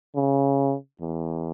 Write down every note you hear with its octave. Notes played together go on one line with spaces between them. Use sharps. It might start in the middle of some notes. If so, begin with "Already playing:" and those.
C#3
E2